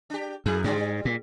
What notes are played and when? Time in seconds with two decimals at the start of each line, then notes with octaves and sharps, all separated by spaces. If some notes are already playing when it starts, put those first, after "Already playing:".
0.10 D4 G4
0.46 F#2 A3 E4 G#4
0.64 G#2 C#3 F#3 G#3
0.76 G3
1.05 A#2